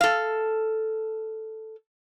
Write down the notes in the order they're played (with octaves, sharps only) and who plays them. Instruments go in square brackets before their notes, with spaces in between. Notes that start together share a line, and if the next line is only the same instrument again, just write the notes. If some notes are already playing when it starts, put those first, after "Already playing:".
[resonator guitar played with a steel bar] A4 F5